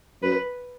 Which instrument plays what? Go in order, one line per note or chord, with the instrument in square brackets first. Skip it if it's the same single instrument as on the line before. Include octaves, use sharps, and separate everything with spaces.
[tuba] F#2 [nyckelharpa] B4